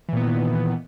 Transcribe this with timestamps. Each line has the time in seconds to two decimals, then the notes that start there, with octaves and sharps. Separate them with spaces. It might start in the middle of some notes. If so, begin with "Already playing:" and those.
0.09 E3
0.13 A#2
0.17 B3
0.21 D#3